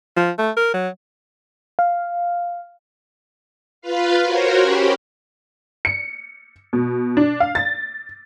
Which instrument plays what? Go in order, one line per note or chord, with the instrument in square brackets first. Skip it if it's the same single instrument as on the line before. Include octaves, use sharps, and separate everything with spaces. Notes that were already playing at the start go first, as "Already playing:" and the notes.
[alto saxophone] F3
A3
A#4
F#3
[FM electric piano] F5
[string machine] F4 B4 F5
F#4 A#4 C5 C#5
C#4 G4 B5
[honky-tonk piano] C#7
B2
D4
F5
A6